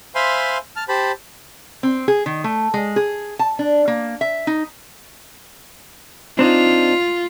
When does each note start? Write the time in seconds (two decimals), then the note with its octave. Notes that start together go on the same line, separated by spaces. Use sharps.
0.15 C5 E5 F5 G#5 B5 C6
0.76 A5 F6
0.89 G4 C5 A5 B5
1.83 C4
2.08 G#4
2.26 D#3
2.44 A3
2.74 G#3
2.96 G#4
3.39 A5
3.59 D4
3.88 A#3
4.21 E5
4.47 D#4
6.39 C4 D4 D#4 F4